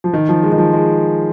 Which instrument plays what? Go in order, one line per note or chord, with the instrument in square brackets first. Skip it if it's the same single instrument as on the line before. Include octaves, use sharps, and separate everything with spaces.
[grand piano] F3
D#3
F3
G#3
D#3
F3
G#3